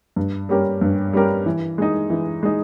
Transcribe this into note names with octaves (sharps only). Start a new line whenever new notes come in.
G2
G3 C#4 G4 A#4
G2
G3 C#4 G4 A#4
E3
G#3 D#4
E3
G#3 D#4